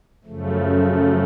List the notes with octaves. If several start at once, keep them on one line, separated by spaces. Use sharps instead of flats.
F#2 C#3 F3 A3